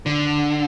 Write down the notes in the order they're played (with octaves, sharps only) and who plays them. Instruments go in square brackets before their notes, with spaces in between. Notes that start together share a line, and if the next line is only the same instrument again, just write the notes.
[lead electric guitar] D3